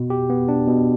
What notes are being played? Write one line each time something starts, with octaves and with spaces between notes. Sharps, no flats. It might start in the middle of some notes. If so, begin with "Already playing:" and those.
Already playing: B2
G4
B3
D4
B2